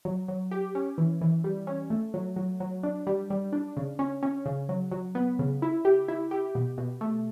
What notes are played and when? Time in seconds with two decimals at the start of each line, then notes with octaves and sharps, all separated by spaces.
0.05 F#3
0.28 F#3
0.51 G4
0.75 C#4
0.98 E3
1.21 E3
1.44 G3
1.67 C#4
1.90 A3
2.14 F#3
2.36 F#3
2.60 F#3
2.83 D4
3.07 G3
3.30 G3
3.53 D4
3.77 C#3
3.99 C#4
4.23 C#4
4.46 C#3
4.69 F#3
4.91 F#3
5.15 B3
5.39 C#3
5.62 E4
5.85 G4
6.08 E4
6.31 G4
6.55 B2
6.78 B2
7.01 A3